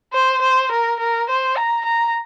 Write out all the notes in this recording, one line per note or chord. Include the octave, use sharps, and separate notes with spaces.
C5
C5
A#4
A#4
C5
A#5
A#5